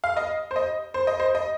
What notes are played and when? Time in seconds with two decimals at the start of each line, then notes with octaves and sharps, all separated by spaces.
0.04 F5
0.17 D#5
0.51 C5
0.56 D#5
0.94 C5
1.07 D#5
1.20 C5
1.35 D#5